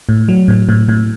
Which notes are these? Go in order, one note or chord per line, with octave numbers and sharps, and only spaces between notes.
A2
F#3
A2
A2
A2